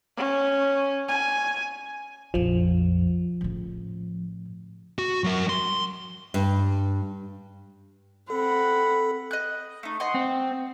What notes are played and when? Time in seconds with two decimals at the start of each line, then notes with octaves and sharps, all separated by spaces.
0.17 C#4
1.08 G#5
2.34 A#1 F2 F3
3.41 A2 C#3
4.99 F#4
5.24 F#3 A#4
5.49 C6
6.34 G2
8.30 C4 A4 F#5 B5
9.31 D#5 F#6
9.83 A3 D#4
10.00 D#5 F#5 C6
10.14 C4